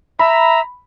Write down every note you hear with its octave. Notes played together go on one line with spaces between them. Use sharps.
E5 A#5 B5